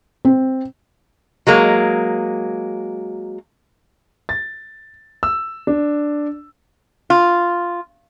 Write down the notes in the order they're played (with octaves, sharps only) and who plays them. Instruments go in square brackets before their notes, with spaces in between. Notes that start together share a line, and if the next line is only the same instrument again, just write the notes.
[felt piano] C4
[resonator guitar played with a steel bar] F#3 G#3 A#3
[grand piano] A6
E6
D4
[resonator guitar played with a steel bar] F4